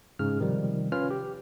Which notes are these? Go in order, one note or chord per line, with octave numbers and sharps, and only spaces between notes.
G#2 C#3 F6
C3 D#3 F3 G3
C#4 F4 B4 F6
G4